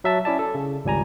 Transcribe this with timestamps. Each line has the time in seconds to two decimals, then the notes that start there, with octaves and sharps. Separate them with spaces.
0.04 F#3 E5 A5
0.25 C#4 E4 D5 A5
0.39 A4
0.55 C#3
0.84 G#1 C#2 G3 G#5 A#5